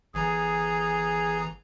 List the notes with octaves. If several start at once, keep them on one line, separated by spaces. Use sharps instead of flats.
G1 E3 G#4 A#5